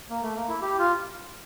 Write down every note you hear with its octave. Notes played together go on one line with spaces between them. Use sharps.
A#3
A3
A#3
E4
G4
F4